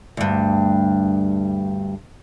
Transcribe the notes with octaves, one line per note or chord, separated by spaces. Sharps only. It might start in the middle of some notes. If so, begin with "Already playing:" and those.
D2 G2